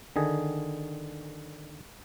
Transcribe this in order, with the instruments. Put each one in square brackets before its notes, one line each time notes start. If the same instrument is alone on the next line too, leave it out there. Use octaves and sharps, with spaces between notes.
[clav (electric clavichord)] D3 D#3 G#4